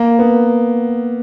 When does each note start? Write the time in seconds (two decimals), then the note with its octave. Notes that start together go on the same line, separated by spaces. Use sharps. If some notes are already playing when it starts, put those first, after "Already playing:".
Already playing: A#3
0.19 B3